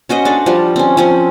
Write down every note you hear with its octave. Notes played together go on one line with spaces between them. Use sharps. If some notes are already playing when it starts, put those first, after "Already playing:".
C#4 F#4 C5 D#5
D4 A4
F3 G3
C4 C#4
F3 C4 C#4